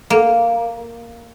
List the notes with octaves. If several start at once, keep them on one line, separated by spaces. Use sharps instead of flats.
A#3